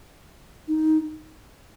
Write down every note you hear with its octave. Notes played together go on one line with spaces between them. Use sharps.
D#4